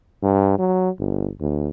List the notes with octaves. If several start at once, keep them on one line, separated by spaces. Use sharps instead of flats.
G2
F#3
G1
D2